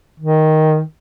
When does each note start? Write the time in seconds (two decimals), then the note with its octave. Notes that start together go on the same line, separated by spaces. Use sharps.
0.20 D#3